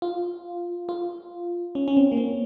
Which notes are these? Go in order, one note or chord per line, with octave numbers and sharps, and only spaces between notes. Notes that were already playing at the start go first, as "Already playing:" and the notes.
F4
F4
C#4
C#4
C4
A#3
C4